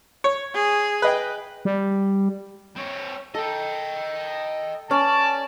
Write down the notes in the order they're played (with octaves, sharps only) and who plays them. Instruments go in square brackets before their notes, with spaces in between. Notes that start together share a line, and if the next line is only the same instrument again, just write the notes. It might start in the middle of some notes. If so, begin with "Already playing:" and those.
[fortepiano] C#5
[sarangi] G#4
[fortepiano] B4 D#5 G5
[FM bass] G3
[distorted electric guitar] C4 C#5
[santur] A4 [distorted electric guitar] D#5 G5
[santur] C#4 [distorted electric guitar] D5 [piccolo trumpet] A5